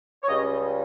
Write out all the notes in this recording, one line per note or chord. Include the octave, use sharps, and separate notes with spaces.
C#5
C#2 C#3 G3 D#5